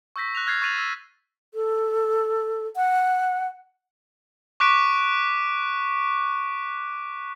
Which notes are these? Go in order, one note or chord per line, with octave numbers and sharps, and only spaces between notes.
C#6 E6 G6 A#6 B6
F#6 A#6 F7
F6 F#6 G#6 A6 C7
C#6 A6 C7 D#7 F7 F#7
E6
A4
F#5
C#6 D6 F#6 B6 D7